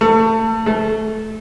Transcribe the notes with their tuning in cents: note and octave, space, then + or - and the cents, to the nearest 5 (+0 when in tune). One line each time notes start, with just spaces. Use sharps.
A3 +30
A3 -15